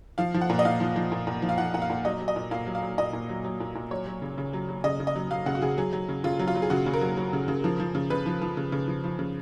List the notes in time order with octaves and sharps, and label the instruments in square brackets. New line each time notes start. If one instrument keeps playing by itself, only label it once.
[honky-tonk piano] F3 F5
F3
F#5
A#2
D#5
A#2 F5
F3
F3
A#2
A#2
F3
F5
F3 F#5
A#2 F#5
F5
A#2
F#3 D#5
F#3
D#5
A#2
A#2 F5
F#3
F5
F#3
A#2 D#5
A#2
F#3
F#3
A#2
A#2
F#3 C#5
F#3
C#3
C#3
F#3
F#3
C#3 D#5
C#3
D#5
F#3
F#3 F5
C#3 F#5
F#4
C#3 G#4
F#3 G#4
F#3
C#3
C#3 F4
F#3
F4
F#3
G#4
C#3 F#4
C#3
A#4
F#3
F#3
C#3
C#3
F3
F3
C#3
C#3 B4
F3
F3
C#3
C#3
F3
F3
C#3